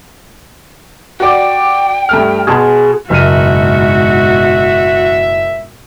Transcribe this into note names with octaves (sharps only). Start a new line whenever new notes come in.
F#4 D5 G5
G2 A3 F6
B2 G#4 A5 C6
F#1 G#2 B2 G#3 F#4 E5 F6 D#7